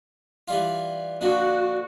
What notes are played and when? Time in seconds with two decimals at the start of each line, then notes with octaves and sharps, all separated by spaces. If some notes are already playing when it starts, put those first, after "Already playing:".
0.48 E3 G3 F4
1.21 A#2 D3 F3 F#4